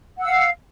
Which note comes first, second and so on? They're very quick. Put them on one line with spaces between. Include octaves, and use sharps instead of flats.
F#5 E6 F5